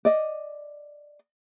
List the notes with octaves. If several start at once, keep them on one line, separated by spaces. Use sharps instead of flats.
D5 D#5